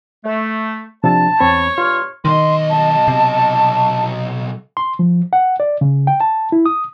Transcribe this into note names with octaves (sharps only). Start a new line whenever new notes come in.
A3
C3 F3 D4 A5
E2 C4 C#5 B5
G2 F4 C6 F6
B1 D#3 D#5 C6
A5
C3
C6
F3
F#5
D5
C#3
G5
A5
E4
D#6